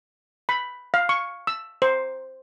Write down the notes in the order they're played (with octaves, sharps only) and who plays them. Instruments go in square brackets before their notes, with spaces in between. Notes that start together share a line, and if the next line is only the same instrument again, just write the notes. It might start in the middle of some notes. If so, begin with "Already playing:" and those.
[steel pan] B5
F5
C#6
E6
C5